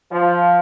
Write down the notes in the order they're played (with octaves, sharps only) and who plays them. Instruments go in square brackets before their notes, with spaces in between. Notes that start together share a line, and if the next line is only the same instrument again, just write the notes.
[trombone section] F3